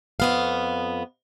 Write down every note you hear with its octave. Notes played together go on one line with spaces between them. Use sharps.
F2 B3 F5